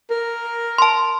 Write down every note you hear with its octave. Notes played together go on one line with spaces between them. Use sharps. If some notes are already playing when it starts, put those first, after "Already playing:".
A#4
A5 C6